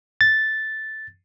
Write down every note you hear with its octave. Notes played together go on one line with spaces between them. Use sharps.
A6